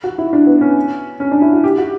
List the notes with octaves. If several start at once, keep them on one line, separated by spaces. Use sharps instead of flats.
F#4
E4
D4
B3
C#4
C#4
D4
E4
F#4
G4
F#4